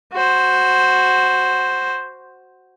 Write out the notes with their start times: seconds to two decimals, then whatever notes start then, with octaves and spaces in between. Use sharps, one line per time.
0.12 F#4 C5